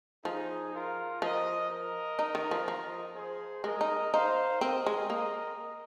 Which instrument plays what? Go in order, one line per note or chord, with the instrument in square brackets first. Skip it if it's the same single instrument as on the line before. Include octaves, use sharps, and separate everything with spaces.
[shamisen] F3 [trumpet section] D#4 G#4
[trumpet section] F4 A#4
[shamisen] F3 [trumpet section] A#4 D#5
[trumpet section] A#4 D#5
[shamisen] D#4
D#3
F3
F3
[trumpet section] G#4 C5
[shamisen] G#3 [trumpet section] A#4 D#5
[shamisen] D#4
[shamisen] D#4 [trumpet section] C5 F5
[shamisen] C4 [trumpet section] A#4 D#5
[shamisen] G#3
[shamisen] A#3 [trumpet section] A#4 D#5